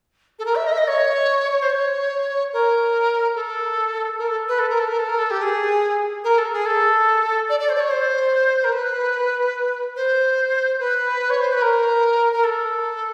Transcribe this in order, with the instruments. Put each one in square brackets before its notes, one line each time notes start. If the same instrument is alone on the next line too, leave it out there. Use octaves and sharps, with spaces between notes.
[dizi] A4
A#4
E5
D#5
E5
D#5
C#5
C5
C#5
A#4
A4
A#4
A4
B4
A4
A#4
A4
A#4
A4
A#4
A4
G4
G#4
A#4
A4
G#4
A4
D5
D5
C5
D5
C#5
C5
A#4
B4
C5
B4
C#5
C5
B4
A#4
A#4
A4